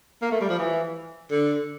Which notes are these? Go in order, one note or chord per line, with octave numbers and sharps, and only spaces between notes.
A#3
A3
G3
F3
E3
D3